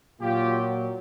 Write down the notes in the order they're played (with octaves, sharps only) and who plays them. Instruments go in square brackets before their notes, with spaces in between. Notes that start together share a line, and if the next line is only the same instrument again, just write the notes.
[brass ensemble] A#2 F#3 F4 G4